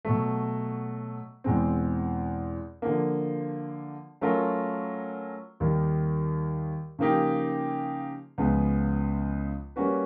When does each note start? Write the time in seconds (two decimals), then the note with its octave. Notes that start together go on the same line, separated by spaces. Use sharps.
0.05 B2 F#3 A3
1.44 E2 B2 G#3 C4
2.82 D3 F3 A#3
4.21 F#3 A3 C#4 F4 A#4
5.60 D#2 D#3 G3 A#3
6.99 C#3 F3 A#3 D#4 G4
8.38 C#2 C#3 F3 G#3 B3
9.76 G3 A#3 C#4 F#4 B4